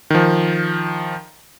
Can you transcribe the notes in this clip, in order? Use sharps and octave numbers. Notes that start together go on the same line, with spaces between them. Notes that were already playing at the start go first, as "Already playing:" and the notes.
D#3 F3